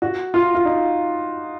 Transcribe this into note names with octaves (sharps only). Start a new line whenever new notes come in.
F#4
F4
F4
D#4